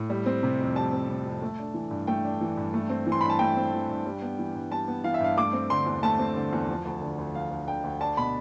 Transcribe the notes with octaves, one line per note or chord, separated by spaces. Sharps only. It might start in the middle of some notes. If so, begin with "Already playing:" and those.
Already playing: A2
G3
C4
C3
F2
G3 A5
C4
C3
F2
A3
D4
E3
G2
A3 G5
D4
E3
G2
A3
C4
E3
C6
G2 B5
A5
A3 G5
C4
E3
G2
G3
B3
E3
G2
G3 A5
B3
E3 F5
E5
G2 F5
A3 D6
C4
D3 C6
E2
A3 A5
C4
D3
E2
F3
D2
D3
D2
F3 F5
D2
D3 G5
D2
D4 A5
B2 B5